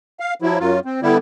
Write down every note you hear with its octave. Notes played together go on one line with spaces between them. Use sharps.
F5
F3 F#3 E4
F#2 F#3 F4
C4
D3 G3 B3 E4